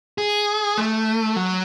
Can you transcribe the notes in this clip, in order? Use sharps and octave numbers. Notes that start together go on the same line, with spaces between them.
G#4
A3
F#3